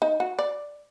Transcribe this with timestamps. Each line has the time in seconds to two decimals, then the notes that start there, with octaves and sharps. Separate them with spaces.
0.02 D#4
0.20 F#4
0.39 D5